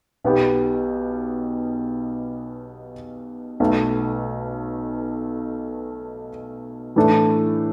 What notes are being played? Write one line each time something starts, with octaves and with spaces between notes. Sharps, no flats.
B1 B2 B3 G4
B1 B2 A3
A2 E3 A3 D4 A4